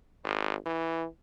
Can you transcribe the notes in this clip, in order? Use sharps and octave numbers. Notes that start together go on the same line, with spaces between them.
G#1
E3